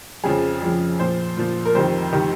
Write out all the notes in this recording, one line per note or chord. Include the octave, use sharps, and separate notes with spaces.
F2 C#3 F3 G#4
F2 C#3 F3
A#2 F3 C5
A#2 F3
A#4
F2 C3 D#3 C5
C3 D#3